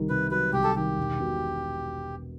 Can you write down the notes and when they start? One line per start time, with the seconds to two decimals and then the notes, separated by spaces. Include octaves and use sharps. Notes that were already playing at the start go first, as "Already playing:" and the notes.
Already playing: C2 D#3
0.09 C3 B4
0.31 F#3 B4
0.53 C2 G4
0.64 A4
0.76 D#3 G4
0.98 E1
1.20 B2